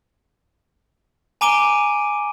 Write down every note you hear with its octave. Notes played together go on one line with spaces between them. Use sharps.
G#5 A#5 D6 D7 D#7 G7